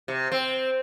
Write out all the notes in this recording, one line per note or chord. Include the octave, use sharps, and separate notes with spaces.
C3
C4